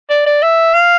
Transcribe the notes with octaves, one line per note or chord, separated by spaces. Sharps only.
D5
D5
E5
F5